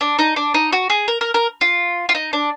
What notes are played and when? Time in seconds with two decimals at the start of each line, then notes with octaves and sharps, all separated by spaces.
0.01 D4
0.19 D#4
0.36 D4
0.54 D#4
0.73 F#4
0.90 G#4
1.08 A#4
1.21 A#4
1.34 A#4
1.61 F4
2.09 F4
2.15 D#4
2.33 D4